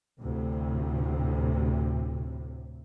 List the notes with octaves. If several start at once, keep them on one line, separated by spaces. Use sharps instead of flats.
D2 A2 C3